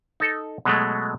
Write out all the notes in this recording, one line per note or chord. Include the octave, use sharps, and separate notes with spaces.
D#4 A4
B2 F#3 G#3 A3